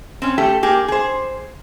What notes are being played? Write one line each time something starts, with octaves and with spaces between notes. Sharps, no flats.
C4 C#4
A3 G4 A4
A#3 G4 G#4
G#4 C5